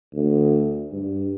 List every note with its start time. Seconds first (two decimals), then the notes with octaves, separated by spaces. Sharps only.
0.13 D2
0.92 G2